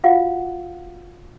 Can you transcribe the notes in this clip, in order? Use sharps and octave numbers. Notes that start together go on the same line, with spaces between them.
F4 F#4 F5 F#5